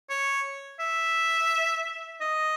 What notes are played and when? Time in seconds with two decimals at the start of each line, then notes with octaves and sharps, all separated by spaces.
0.10 C#5
0.80 E5
2.21 D#5